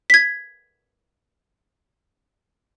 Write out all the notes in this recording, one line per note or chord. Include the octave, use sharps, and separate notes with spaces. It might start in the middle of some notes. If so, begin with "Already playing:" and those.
G#6 B6